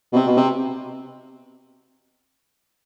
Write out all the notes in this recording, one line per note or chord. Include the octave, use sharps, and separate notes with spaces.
B2
C3
B2
C3